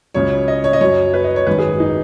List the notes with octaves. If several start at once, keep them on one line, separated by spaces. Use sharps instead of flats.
C#2 C#3 F#3 C#5
D#5
C#5
D#5
F#2 F#3 C#5
B4
D#5
C#5
G#1 F#2 D#3 B4
G#4
D#4